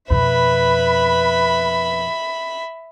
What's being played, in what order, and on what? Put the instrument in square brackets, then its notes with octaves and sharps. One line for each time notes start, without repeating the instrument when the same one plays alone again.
[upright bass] F2 B2 [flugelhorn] B4 [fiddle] E5 B5